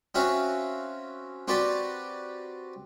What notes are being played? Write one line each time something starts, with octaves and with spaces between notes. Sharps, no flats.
C4 C#4 F#4 E5 F5
C4 F#4 G4 B4 D5